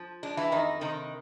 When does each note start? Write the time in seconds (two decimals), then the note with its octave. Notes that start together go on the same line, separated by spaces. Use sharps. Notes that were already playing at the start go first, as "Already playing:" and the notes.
Already playing: F3
0.23 G#3 D4
0.37 E3 E4
0.52 F2 D#3 D#4
0.81 C3 D#3 D#4